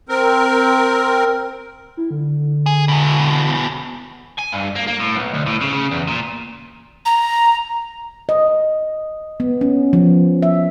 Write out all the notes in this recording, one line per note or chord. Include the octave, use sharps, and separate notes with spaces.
C4 A#4
E4
D3
G#4
E2 B2
G#5
G2
A#3
A#3
A2
B1
D2
A2
C#3
C#3
E2
A#2
A#5
D#5
B3
C#4
F3
E5